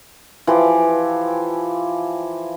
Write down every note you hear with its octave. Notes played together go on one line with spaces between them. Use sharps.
E3 F3 G4